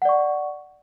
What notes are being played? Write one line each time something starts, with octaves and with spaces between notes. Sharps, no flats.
D5 F#5 C#6